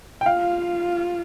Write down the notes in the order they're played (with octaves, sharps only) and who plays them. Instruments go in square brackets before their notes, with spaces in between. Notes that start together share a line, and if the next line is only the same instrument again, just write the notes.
[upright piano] G5
[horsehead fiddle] F4 [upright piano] F5